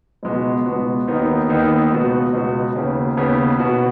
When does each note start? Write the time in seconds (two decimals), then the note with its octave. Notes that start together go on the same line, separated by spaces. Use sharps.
0.23 C#2 B2 G#3 B3 F#4
0.66 C#2 B2 G#3 B3 F#4
1.07 D#2 D#3 B3 D#4
1.49 D#2 D#3 B3 D#4
1.92 C#2 B2 B3 F#4
2.33 C#2 B2 B3 F#4
2.76 D#2 C#3 B3
3.17 D#2 C#3 B3
3.59 B2 B3 F#4